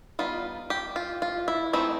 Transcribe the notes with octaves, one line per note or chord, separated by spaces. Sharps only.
G3 B3 D#4 F4
G4
F4
F4
E4
E3 A3 C4 D#4 E4